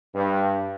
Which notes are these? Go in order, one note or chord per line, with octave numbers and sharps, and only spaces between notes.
G2